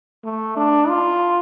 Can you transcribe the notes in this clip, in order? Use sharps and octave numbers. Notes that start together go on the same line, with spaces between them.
A3
D4
F4